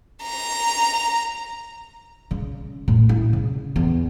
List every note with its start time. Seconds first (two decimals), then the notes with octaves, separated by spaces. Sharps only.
0.23 A#5
2.31 C#3
2.88 A2
3.09 E4
3.33 C#3
3.76 E2